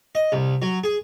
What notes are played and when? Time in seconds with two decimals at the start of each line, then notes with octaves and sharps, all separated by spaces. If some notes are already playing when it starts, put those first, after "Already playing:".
0.15 D#5
0.32 C2
0.62 F#3
0.84 G#4